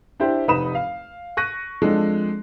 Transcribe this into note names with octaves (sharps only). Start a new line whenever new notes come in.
D4 E4 G4 C5
F1 D#4 B4 B5 D#6 E7
F5
C#6 F#6 A#6 D#7
F3 G#3 C4 D4 A4